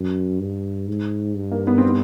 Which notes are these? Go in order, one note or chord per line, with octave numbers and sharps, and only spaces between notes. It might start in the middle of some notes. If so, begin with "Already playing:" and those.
Already playing: F#2
G2
G#2
G2
A#3
B3
C4
B3